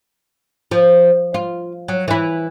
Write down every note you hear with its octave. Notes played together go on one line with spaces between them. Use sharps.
F3
F4
F#3
E3 E4